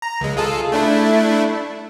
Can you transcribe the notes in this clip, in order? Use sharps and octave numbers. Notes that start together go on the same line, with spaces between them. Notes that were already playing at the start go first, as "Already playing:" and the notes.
A#5
C#2 G#3
F4 G#4 A4
A3 D4 E4